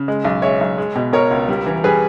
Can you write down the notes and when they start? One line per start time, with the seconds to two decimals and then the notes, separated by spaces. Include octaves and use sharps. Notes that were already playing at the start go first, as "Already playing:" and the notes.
Already playing: C#3
0.08 G#3
0.25 B1
0.42 G#3 C#5 E5
0.61 B1
0.78 G#3
0.95 B2
1.13 B2 A#4 C#5
1.31 C#2
1.48 G3
1.66 E3
1.84 G3 G#4 B4